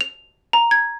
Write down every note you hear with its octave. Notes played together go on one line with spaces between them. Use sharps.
F7
A#5
G#6